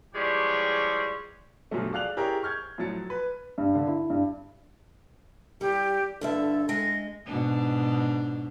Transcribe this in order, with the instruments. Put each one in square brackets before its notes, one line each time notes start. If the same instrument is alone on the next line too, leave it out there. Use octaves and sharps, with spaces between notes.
[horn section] E3 F3 G3 G#3 G4 C#5
[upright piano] B1 G2 F3 F#3 A3
G#4 D5 F5 F#6 F7 F#7
E4 G4 G#4 A#4 C#5
C#6 F6 G6 G#6
A2 F3 F#3 A6 C#7
B4
[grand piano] G2
D3
E4
G2
[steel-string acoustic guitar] G3 [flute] G4
[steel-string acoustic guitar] G2 D3 E5 [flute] A4
[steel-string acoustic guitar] G#3 [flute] A#6
[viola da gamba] G#2 B2 D4